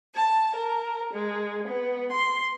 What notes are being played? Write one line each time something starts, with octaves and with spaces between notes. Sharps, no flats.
A5
A#4
G#3
B3
C6